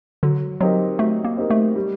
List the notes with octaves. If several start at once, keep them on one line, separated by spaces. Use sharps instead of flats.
D3 F#3
F#3 C4 D#4 G4 A#4
F#3 A3
A#3
C4 D#4 G4 A#4
A3
G3